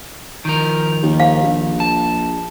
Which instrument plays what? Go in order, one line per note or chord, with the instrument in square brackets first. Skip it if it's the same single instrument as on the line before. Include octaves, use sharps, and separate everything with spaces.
[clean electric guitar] D#3 F3 A#4
[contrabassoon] D#2
[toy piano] F5
[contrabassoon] A#1
[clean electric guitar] A5